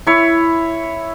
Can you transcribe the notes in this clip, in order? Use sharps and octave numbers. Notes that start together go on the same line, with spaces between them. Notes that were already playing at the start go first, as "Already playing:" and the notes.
E4 C#5